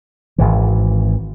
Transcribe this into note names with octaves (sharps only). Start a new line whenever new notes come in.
G#1 C#2 E3